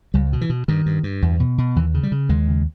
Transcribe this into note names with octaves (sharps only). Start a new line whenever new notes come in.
C#2 G3
B2
E3
B2
G2 D#3
G2
G2
E2
B2
B2
D#2 E3
C#3
G3
C#3
D#2 G#3
C#3